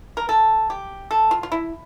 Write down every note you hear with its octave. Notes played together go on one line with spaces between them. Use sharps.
A#4
A4
G4
A4
F4
F4
E4